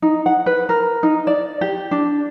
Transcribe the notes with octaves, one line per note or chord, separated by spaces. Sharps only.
D#4
F#5
B4
A#4
D#4
D5
G4
D4